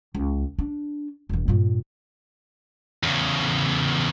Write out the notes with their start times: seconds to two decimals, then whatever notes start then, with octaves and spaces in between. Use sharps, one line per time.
0.15 C#2
0.59 D4
1.29 E1 E3
1.48 G2 A#2
3.03 E2 C#3